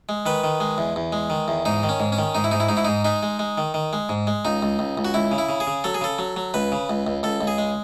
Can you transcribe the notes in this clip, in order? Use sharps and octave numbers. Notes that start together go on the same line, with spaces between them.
G#3
D#3 B4
D#3
G#3
E2
E2
G#3
D#3
E2
G#2 D#4
D#3
C#4
G#2
C#4
D#3
G#2 D#4
E4
G#2 D#4
E4
G#2 D#4
E4
G#2 D#4
G#3 D#4
G#3
G#3
D#3
D#3
G#3
G#2
G#3
C#2 D#4
C#2
C#2
C#2
F#4
C#2 E4
C#3
E4
C#3
G#4
C#3
F#3 A4
G#4
C#3 A4
F#3
F#3
C#2 B4
C#3
C#2
C#2
C#2 A4
C#2
G#4
G#3